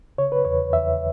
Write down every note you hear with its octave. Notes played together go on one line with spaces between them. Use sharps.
C#3 C#5
B4
E2 C#5
E2 E5